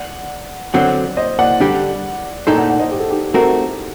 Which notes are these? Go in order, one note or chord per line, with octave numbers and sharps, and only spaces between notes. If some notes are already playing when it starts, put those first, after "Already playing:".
Already playing: D5 F#5
D3 F#3 C4 D5 F#5
C5 D#5
D5 F#5
D3 G3 D4 G4
A#2 A3 D#4 A4 C5 D#5 G5
D5 F#5
D5 F#5
C5 D#5
G4
A4
D#4 G4
A3 C4 F#4 A#4